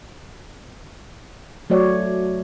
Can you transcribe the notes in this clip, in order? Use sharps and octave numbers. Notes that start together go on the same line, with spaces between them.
F#3 A3 F#4 C#5 D5